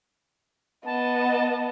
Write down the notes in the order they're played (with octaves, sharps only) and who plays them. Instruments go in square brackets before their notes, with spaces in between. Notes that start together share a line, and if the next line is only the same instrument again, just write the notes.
[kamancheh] B3 D#5 [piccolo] A5